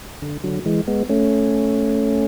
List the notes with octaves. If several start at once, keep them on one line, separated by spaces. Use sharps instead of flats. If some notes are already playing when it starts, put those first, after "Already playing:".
D3
D3 F#3
E3 G#3
G#3 B3
A3 C#4